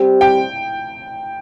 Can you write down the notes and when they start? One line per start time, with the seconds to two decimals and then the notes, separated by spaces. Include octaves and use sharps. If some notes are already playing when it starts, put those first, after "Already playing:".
Already playing: G3 C4 G4 C5
0.21 G5